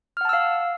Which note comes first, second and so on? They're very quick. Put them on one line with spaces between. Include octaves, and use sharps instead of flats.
F6 F#5 A5 E6 F5